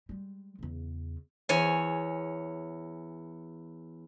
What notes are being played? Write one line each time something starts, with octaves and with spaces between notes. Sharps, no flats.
G3 G#3
E2 C#3
E2 C#5 G#5